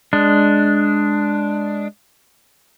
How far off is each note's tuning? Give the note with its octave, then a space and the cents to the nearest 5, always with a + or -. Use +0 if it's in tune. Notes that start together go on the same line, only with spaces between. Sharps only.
G#3 +0 D4 +0